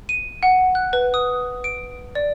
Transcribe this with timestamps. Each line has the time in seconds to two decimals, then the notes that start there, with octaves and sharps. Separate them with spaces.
0.09 D#7
0.43 F#5
0.75 F#6
0.93 B4
1.14 D#6
1.64 D7
2.15 D5